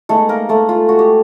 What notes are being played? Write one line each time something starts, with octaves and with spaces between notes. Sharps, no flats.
G#3 A3 B3 D#4 A4
A#3 A#4
A3 A4
F4
F#4
G4